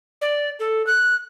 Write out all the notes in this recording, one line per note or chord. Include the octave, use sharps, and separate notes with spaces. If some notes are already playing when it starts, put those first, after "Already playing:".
D5
A4
F#6